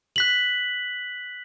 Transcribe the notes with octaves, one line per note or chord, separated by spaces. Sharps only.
F#6 B6 F#7